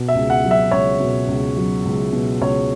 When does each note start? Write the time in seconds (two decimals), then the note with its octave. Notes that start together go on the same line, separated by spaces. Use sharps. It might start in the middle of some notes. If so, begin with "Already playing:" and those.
Already playing: B2
0.08 E5
0.15 C#2
0.30 F#5
0.44 F#3
0.51 E5
0.71 C#2 C#5
1.00 B2
1.28 C#2
1.57 F#3
1.85 C#2
2.13 B2
2.41 C#2 C#5